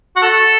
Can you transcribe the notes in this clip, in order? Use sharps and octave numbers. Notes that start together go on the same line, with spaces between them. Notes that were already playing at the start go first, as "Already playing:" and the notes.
F#4
A4